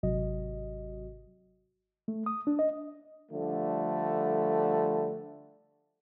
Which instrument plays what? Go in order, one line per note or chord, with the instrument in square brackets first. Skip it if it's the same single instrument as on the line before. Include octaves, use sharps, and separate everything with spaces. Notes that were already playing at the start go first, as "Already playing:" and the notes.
[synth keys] G#1 C3 F#3 F#4 D#5
[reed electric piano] A3
D#6
D4
D#5
[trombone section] D3 F3 G3 A3